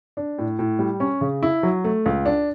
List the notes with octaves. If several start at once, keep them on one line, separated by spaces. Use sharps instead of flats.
D4
A2
A2
G3
C#4
C#3
E4
F#3
A3
C#2
D4